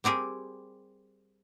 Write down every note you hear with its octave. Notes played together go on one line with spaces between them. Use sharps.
G3 C4 G4 G#4 A#4